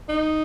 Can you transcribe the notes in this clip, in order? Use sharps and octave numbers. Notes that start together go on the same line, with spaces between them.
D#4